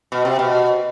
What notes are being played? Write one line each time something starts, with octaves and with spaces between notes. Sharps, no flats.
B2
C3
B2